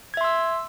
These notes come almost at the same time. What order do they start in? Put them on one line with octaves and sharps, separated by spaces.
G#6 E5 C6 E6